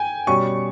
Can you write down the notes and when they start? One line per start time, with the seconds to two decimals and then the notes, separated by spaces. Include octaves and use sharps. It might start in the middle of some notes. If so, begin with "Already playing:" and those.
Already playing: G5 G#5
0.27 B2 G3 C#4 C#6